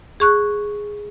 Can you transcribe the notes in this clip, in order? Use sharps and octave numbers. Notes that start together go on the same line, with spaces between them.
G#4 C#6 F#6